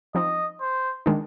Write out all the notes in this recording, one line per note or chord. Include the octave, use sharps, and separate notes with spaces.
F3 C4 D#4 D#5
C5
D#3 G#3 D4